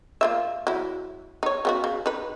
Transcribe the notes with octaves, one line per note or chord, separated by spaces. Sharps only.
A#3 F4 E5
F#3 E4
D#4 C#5
C#3 B3 F#4
C#3
D#4 B4